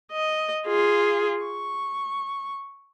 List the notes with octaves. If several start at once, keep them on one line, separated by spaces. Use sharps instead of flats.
D#5
F4 G#4
C#6